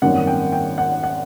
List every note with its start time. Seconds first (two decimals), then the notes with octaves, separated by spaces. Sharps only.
0.02 G#1 F#2 D#3 G3 A#3 F#5
0.27 G5
0.52 G5
0.78 F#5
1.03 F#5